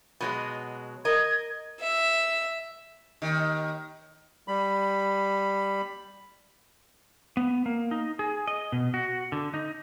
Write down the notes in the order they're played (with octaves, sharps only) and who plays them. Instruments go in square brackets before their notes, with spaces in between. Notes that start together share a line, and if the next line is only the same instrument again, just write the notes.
[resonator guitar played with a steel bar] B2 F#3 G#3
[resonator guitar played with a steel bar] A#4 D#5 [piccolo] G#6
[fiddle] E5
[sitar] D#2 D#3
[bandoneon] G3 B5
[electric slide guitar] B3
A#3
D#4
G#4
D#5
B2
F#4
D3
D#4